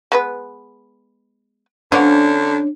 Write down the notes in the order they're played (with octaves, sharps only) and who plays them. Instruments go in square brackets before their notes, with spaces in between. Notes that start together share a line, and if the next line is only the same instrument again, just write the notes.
[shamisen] G#3 B3 B4
[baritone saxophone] D3 [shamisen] F3 B3 F#4 [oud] C#4 D4